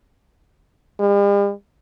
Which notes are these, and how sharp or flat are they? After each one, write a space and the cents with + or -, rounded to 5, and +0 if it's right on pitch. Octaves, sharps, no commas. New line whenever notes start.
G3 +45